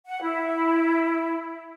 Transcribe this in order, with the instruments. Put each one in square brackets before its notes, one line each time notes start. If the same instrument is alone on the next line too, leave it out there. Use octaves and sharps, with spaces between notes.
[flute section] F#5
E4